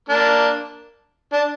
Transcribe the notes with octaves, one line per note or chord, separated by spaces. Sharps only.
A#3 D4
D4